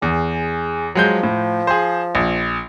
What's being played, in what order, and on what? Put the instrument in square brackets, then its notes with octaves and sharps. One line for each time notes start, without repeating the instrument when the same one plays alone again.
[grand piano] E2 [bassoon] G#4
[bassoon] F3 [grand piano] F#3 G#3 G6
[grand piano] A2
G#4 C5
A#1